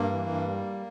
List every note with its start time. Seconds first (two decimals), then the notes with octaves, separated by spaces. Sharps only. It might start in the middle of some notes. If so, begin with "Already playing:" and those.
Already playing: G2 A#3
0.12 E3
0.30 G2
0.47 G3